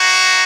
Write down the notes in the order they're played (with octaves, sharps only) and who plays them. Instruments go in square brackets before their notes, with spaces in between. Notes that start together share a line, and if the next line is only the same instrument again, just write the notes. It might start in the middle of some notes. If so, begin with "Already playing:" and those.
Already playing: [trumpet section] A#3 D#4 F#4